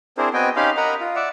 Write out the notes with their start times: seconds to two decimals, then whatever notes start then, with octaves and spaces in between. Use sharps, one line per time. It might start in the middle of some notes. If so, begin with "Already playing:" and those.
0.18 C4 D4 E4 G#4 A#4 C5
0.34 B3 C4 F#4 D#5 G5 G#5
0.56 C#4 D#4 G4 F5 B5 C6
0.77 A#4 D#5 F#5 A#5 B5
1.01 F4
1.16 D5 E5 F#5